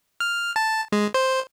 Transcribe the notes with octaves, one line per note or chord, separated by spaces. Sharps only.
F6
A5
G#3
C5